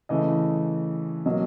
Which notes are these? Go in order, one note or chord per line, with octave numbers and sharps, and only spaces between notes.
C#3 E3 A3 D#5
B2 F#3 A#3 D#5